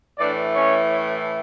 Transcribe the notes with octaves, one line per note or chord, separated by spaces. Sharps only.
A2 E3 A3 D4 D5
C#4 C#5